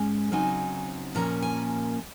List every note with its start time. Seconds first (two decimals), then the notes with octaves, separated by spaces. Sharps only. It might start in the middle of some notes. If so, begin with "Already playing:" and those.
Already playing: G#2 G#3 C#4
0.31 C#3 F#3 C4 D#4 G#5
1.15 A#2 F3 A#3 C#4 A#5
1.42 G#5